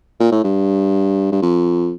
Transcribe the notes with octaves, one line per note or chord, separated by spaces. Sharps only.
A#2
A2
G2
G2
F2